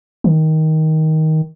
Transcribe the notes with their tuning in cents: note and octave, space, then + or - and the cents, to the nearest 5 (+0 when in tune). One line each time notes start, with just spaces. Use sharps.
D#3 +15